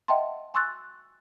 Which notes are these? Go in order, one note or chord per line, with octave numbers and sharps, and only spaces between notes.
D#5 E5 F#5 G5 A5 C6
G#5 C6 C#6 E6 F#6 A6